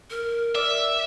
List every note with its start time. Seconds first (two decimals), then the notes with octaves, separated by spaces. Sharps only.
0.10 A#4
0.55 D5 E5